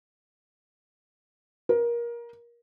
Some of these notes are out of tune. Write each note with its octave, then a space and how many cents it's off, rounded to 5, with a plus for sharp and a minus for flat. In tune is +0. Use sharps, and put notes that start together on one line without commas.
A#4 +20